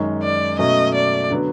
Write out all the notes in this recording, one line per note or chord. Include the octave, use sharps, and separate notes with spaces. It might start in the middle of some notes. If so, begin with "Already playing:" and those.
Already playing: F#2 D#3 G#3 C#4
D5
B2 F#3 A3 C#4 D#5
D5
D3 F#3 B3